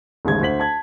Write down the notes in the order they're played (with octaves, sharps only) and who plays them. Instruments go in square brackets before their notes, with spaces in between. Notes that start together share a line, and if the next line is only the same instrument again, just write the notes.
[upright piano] A1 D#2 G#2 C#3 G#3 G#6
D2 C5 B6 F#7
A5 G#6